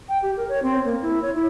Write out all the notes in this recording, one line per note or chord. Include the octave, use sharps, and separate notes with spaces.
G5
G4
A#4
C#5
C4
A#3
E4
C#5
E4